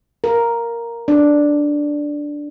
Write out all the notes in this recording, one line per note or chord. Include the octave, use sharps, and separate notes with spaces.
A#4
D4